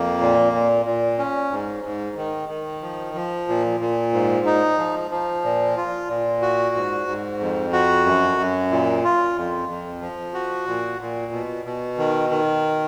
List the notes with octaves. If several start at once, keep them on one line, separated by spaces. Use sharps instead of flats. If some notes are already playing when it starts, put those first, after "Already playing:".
Already playing: F2 A#3
A#2
A#2
A#2
C#4
G#2
G#2
D#3
D#3
F3
F3
A#2
A#2
G#2
D#4
F3
F3
A#2
F4
A#2
F#4
G#2
G#2
F2
F#4
F#2
F#2
A#2
F4
F2
F2
F3
F#4
A#2
A#2
B2
B2
D#3
D#3